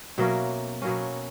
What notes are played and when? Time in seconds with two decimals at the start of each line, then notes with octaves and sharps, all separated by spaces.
0.18 B2 F#3 A#3 C#4 E5
0.82 B2 F#3 A#3 C#4